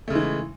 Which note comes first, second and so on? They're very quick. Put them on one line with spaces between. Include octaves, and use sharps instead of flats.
A3 C#3 G#3 E3